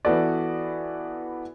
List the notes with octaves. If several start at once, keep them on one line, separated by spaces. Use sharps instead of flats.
E3 B3 F#4 A4 D5